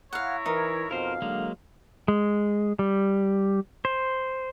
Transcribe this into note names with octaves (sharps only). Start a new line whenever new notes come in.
E4 C#5 F5 F#5 A#5
E3 D#4 A#4
F2 B2 F3 A#4 C5 F5
D3 F#3 G#3 A#3
G#3
G3
C5